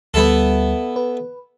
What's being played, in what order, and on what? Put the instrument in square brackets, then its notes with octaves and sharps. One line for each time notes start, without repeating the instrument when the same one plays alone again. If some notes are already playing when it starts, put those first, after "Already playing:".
[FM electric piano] D2 G3 [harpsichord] B3 E4 A4
[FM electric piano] B4